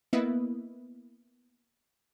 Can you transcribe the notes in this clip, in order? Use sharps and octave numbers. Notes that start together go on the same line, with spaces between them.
A#3 B3 E4 B4 D#5 E5